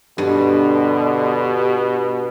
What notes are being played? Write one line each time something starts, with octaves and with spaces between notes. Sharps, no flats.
G2 B2 D3 G4